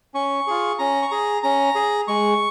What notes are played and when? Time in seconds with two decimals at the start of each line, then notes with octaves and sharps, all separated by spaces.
0.14 C#4 C#6
0.47 F4 G#4
0.79 C#4 A#5
1.02 C#6
1.11 G#4 A#5
1.43 C#4 A#5
1.75 G#4
2.08 G#3 C#6